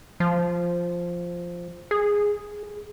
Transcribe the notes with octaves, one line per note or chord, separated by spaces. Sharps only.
F3
G#4